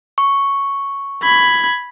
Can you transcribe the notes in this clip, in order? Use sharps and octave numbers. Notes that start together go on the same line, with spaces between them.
C#6
B5 G#6